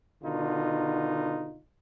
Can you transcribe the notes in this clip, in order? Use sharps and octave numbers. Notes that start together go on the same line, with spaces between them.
B2 D3 D#3 D#4 F4